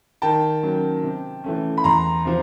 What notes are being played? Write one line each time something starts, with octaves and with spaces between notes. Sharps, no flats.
D#3 G5 A5
F#3 A#3 C#4
C3
E3 A3 C#4
B5
E2 A#5 C6
C3 F3